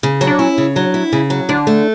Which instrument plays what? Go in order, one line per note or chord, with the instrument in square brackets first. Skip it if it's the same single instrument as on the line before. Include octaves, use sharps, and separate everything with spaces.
[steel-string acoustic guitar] C#3
F#3
[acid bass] D4
[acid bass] C#4 [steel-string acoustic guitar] E4
[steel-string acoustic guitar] C#3
[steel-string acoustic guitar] F#3 [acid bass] D4
[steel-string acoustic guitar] E4
[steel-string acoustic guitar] C#3 [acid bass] C#4
[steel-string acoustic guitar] F#3
[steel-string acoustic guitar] D3 [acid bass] D4
[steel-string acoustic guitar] A3